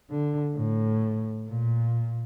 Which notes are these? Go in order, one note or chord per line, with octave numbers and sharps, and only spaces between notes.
D3
A2
A#2